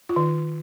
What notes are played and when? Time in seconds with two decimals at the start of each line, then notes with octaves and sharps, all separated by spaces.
0.09 F4
0.16 D#3